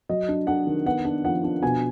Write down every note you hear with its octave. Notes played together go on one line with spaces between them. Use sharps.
F#3 D#5
D4
D4 F#5
D#3
B3 F#5
D4
F3 F#5
D4
B2 G#5